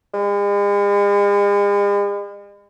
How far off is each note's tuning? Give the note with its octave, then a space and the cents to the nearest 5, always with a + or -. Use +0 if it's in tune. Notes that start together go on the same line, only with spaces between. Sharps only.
G#3 -45